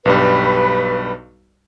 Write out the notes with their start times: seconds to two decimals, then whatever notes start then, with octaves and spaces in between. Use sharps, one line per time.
0.05 B1 G2 G3 B4